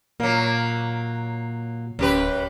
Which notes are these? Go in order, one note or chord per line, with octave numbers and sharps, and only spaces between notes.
A#2 F#3 A#3
D1 F#2 G4 B4